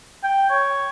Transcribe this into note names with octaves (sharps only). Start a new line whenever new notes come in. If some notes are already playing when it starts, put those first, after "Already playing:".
G5
C#5